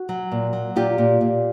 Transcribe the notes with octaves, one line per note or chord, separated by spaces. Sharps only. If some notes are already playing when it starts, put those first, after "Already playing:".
Already playing: F#4
F#3
A#2
F#3
A#2 F4 G4
A#2
A#2